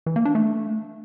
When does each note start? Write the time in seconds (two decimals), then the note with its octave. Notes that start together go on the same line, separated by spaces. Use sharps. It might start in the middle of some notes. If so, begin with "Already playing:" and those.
0.06 E3
0.16 A#3
0.25 D4
0.35 A3